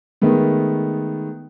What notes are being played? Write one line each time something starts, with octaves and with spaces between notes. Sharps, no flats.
D#3 G#3 A3 B3